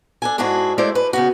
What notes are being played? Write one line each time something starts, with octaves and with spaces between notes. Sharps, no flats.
D4 A4 G#5
G#2 D4 E4 F#4 G#4
G#3 A3 E4 C5 D5
B4
C#3 B3 F#4